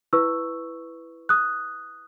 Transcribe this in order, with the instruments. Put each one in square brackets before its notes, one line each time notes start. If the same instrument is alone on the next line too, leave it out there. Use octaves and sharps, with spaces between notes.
[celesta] E4 B4 C#6 E6
D#6 F#6